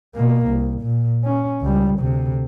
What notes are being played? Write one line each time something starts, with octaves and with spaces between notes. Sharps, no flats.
B2 A#3
C2
A#2
C#4
C#2 G3
D2 C3